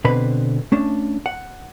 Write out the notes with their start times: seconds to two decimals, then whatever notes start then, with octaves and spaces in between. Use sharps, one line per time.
0.04 B2 D3 C4 B4 B5
0.72 A3 C#4 D4
1.26 F#5